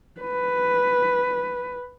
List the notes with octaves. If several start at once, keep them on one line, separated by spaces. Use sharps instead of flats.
B4